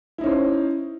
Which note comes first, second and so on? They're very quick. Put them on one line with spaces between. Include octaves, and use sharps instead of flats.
E4 D#4 C#4 C5